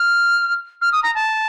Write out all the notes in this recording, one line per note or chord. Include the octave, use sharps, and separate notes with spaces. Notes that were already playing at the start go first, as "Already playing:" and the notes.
Already playing: F6
F6
D#6
A#5
A5